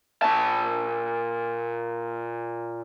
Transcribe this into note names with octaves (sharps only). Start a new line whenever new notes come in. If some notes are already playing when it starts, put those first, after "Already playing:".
A#2 A5